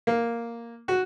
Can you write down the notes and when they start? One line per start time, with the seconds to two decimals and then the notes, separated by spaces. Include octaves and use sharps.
0.07 A#3
0.88 F#4